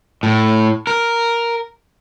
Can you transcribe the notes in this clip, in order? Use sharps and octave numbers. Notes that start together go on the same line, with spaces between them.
A2
A#4